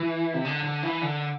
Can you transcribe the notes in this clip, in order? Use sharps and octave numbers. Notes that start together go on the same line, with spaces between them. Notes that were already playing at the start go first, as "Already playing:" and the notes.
Already playing: E3
C3
D3
D3
E3
D3